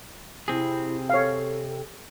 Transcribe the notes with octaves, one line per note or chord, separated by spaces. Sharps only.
C3 C4 E4 G#4
A4 C#5 F5